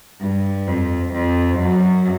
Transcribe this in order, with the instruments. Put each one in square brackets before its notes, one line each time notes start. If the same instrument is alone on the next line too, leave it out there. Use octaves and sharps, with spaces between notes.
[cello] G2
F2
F2
F#2